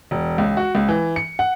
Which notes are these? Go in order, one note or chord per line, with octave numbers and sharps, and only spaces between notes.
E1
C#2
F#4
C#2
E3
C#7
F#5